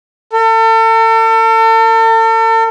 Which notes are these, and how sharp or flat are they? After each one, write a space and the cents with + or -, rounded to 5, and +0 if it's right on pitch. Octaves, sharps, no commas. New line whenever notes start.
A4 +40